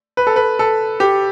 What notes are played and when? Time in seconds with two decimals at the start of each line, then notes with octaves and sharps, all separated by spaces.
0.17 B4
0.27 A4
0.36 B4
0.59 A4
1.00 G4